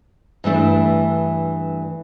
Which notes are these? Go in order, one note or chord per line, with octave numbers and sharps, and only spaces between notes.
G2 E3 A3 D4